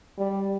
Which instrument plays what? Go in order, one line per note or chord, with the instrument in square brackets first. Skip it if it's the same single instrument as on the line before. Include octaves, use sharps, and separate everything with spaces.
[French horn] G3